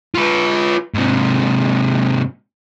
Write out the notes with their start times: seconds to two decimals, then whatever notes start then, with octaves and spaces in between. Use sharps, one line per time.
0.15 F4 B4
0.95 G#2 C3